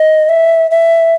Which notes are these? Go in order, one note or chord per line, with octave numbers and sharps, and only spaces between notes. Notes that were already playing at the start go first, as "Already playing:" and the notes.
Already playing: D#5
E5
E5